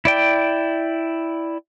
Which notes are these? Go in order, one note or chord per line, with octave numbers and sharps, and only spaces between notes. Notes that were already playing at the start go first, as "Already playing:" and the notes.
E4 D5 G5